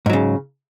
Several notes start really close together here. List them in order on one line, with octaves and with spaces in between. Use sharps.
G#2 F#3 C#3